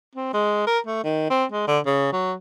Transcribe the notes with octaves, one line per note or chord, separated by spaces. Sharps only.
C4
G#3
A#4
A3
D#3
C4
G#3
D3
C#3
F#3